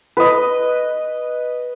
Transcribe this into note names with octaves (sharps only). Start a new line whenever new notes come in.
B4 D#5